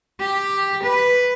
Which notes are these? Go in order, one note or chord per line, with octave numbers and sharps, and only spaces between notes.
G4
B4